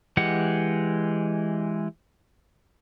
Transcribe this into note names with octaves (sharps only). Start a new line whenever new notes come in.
E3 G#3 G4 F#5